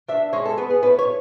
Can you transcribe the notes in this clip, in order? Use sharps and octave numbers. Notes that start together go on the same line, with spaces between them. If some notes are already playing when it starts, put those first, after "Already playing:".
D4 E5
G#3 C#5
A4
B3 B4
G#4
A2 B4
C#5